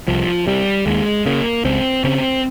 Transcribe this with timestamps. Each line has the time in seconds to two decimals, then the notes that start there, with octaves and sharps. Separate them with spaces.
0.08 C2 F3
0.47 C3 G3
0.86 D#2 G#3
1.26 C#3 A#3
1.65 C#2 C4
2.04 C#3 C4